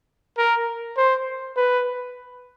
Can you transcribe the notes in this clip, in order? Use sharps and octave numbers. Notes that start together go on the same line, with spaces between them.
A#4
C5
B4